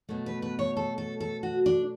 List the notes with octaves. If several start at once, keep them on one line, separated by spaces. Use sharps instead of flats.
B2 F#3 A3
B4
B4
C#5
A4
A4
A4
F#4
D4